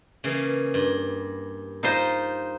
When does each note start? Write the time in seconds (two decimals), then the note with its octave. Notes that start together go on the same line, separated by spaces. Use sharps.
0.24 C#3 E3 A#3
0.74 G2
1.83 D#4 F4 C5